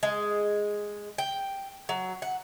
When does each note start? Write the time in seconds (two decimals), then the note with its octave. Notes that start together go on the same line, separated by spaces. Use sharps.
0.03 G#3
1.18 G5
1.89 F#3
2.22 F#5